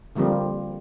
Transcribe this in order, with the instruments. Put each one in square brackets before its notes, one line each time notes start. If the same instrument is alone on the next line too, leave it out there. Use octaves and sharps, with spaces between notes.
[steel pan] D3 F3 G3 A#3 C4